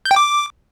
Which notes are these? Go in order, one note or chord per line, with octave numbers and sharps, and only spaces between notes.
G6
G5
D6